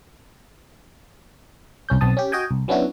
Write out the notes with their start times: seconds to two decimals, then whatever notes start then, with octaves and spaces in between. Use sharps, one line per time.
1.89 C2 C#4 G6
2.01 B1 C4 A5 D#6
2.17 C#4 G4
2.32 F#4 D#5 G5 G#5
2.51 C2
2.68 F#3 B3 C#4 D4 E4 F#4